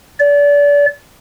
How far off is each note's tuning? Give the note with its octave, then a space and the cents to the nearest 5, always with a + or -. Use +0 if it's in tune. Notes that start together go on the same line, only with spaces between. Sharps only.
D5 -30